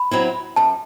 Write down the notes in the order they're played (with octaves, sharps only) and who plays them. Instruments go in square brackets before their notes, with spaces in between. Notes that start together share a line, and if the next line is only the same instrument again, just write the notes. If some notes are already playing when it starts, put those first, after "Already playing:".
Already playing: [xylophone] B5
[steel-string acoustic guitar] F#3 C4 E4
[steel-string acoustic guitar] F#2 [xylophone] A5